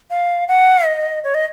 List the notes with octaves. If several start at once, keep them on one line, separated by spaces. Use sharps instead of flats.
F5
F#5
D#5
C#5
D#5